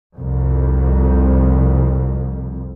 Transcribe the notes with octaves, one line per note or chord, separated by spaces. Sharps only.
C2 F2